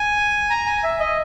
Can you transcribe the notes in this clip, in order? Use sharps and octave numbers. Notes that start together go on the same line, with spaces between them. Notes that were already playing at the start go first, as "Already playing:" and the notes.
Already playing: G#5
A#5
G#5
E5
D#5